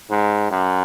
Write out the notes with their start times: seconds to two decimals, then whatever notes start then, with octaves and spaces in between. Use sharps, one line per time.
0.10 G#2
0.51 F#2